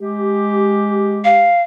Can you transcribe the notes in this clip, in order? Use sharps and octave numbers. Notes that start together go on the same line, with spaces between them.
G#3 G4
F5